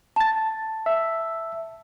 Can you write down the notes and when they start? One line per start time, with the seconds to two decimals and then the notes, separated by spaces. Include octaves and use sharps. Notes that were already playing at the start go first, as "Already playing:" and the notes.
0.16 A5 A6
0.86 E5